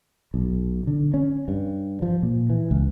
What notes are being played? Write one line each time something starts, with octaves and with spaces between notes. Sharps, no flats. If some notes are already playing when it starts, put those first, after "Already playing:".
B1
D3
C#4
G2
F3
A#2
E3
C#2